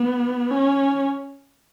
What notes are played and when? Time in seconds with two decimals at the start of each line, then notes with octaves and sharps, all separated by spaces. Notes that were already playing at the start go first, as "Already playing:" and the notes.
Already playing: B3
0.51 C#4